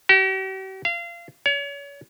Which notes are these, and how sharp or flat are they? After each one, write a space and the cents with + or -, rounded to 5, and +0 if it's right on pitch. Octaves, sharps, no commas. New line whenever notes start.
G4 -45
F5 -25
C#5 +35